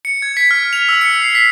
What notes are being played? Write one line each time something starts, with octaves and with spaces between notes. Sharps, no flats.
C#7
G#6
B6
F6
F7
E6
C#7
C7
B6